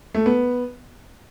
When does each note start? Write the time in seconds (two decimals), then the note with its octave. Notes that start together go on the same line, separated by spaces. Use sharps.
0.15 A3
0.26 B3